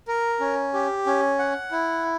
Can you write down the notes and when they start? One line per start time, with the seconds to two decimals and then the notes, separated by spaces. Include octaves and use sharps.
0.08 A#4
0.40 C#4
0.73 G4
1.06 C#4
1.39 F#5
1.71 E4